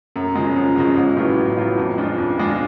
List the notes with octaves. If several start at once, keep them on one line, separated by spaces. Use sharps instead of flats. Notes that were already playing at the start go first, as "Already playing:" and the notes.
F#2
C#3 F3 G#3
F#2
C#3 F3 G#3
A1
A2 F#3 B3 F4
A1
A2 F#3 B3 F4
F2
F3 G#3 D4 F4
F2
F3 G#3 D4 F4